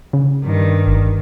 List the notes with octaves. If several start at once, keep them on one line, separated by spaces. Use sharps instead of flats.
C#3
G2 D#3
G1